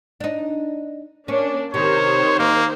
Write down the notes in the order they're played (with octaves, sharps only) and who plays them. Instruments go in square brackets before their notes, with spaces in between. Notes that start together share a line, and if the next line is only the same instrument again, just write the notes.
[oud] D4 D#4
[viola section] A#3 D4 [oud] C#4
[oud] C3 [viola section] D#3 C5 [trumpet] C#5
[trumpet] A#3 [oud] D#4